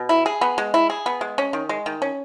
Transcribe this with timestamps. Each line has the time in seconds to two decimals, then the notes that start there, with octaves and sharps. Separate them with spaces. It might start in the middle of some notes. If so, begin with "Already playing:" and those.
Already playing: B2
0.09 E4
0.26 G#4
0.41 B3
0.58 G#3
0.74 E4
0.90 G#4
1.06 B3
1.21 G#3
1.38 C#4
1.53 D#3
1.69 G#3
1.86 D#3
2.02 C#4